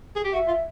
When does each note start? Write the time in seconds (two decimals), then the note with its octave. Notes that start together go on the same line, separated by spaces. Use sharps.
0.16 G#4
0.25 G4
0.33 F#4 E5
0.48 F4